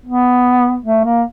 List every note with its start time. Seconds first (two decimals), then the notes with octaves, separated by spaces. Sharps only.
0.06 B3
0.85 A3
1.05 A#3